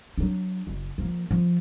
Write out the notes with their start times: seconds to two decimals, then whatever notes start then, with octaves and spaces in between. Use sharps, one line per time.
0.18 F#3 D4
0.67 F#1
0.98 F3 A#3
1.31 F3